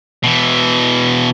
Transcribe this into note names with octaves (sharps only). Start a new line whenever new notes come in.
B2 E3